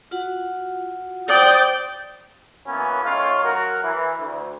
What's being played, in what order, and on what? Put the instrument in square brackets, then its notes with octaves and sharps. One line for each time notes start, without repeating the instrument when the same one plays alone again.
[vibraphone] F4 F#4 F#5
[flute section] C5 D#6 G6 [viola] D5 G5
[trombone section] E3 F#3 A#3 B3 C#4
D#3 F3 A3 C#4 F4
F#3 F#4 A#4
E3
D2